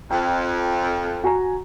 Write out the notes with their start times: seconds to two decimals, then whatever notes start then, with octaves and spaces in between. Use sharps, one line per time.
0.11 F2 G5
1.24 F#4 G#5 A#5